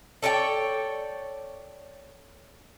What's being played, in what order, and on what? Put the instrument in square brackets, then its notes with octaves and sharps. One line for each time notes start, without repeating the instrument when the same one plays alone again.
[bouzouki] A4 C#5 D5 G5